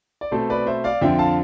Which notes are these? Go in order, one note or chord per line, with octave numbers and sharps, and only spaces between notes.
D5
B2 A3 C4 A4 C5
B4 D5
C5 E5
D5 F5
F2 D3 F3 C4 E5 G5
F5 A5